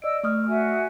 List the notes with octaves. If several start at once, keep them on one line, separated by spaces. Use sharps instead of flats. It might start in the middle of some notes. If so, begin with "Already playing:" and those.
D5 D#5 E6 D7
A3 C#6 D#6 F6
F#4 E5 G#5